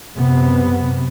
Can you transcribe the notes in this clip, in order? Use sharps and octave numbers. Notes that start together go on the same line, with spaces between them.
F#2 C3 B3